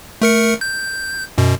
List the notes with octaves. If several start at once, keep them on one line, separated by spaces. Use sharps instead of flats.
A3 A#4 C#7
G6
F#2 B2